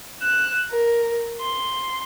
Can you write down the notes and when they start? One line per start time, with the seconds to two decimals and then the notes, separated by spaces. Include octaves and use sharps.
0.22 F#6 E7
0.71 A#4
1.41 C6